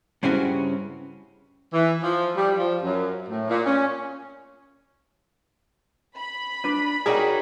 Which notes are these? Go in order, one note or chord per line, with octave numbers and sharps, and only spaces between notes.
G2 C#3 C4 C#4 E4 F#4
E3
F3
G3
F3
F#2
A2
A#2
C#4
B5
D4 B4
C#4 D#4 F#4 G#4 A#4 D5 G5